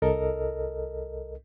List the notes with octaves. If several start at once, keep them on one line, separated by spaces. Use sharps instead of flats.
C2 A4 A#4 D#5